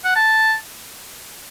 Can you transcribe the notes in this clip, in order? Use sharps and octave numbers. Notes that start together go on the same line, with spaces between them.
F#5
A5